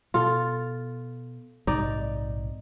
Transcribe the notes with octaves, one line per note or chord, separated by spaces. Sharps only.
B2 F4 A4
A#1 G#2 C3 D#4 D5